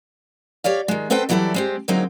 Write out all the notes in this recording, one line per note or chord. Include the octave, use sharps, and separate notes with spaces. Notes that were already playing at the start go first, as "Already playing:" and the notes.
G4 C#5 D5 F5
D#3 G#3
B3 C4 A4 B4 C5 G5
E3 F#3 G3 E4 A4 D5
G#3 C4 G4
D3 F#3 G#3 A#3 C4 D#4